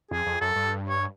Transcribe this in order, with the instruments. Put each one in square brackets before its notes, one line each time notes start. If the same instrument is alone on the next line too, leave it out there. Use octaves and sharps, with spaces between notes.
[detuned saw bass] F2 [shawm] G#4
[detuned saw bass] F2
[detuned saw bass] F#2 [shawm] A4
[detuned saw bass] G2
[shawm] C#5